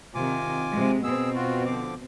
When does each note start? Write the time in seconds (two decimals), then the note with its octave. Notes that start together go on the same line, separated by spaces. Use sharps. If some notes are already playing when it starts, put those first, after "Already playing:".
0.15 C3 D#3 F4 G#5 D6
0.71 C3 G#3
1.03 B2 C4 G#4 E6
1.35 F4 F#4
1.66 D3 F3 D6